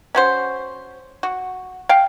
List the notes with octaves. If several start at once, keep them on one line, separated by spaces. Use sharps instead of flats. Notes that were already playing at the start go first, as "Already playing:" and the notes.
C#4 F#4 C5
F#4
F5 G5